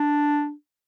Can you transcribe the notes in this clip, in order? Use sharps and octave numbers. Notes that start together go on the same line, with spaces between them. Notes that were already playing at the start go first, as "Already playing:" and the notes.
Already playing: D4